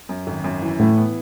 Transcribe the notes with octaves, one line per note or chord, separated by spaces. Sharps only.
F#2
G#1
F#2
E3
A2 E3 A3
B3